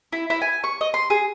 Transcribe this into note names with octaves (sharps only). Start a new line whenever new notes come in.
E4
E4
G#5
C#6
D#5
C6
G#4